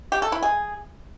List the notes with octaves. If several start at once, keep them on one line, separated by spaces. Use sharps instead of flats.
G4
A4
E4
G#4